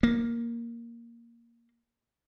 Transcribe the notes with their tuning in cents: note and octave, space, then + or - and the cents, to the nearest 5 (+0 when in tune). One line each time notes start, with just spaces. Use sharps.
A#3 +5